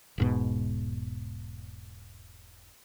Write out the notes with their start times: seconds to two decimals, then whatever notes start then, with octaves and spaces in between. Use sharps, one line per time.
0.18 E1 G#2 B2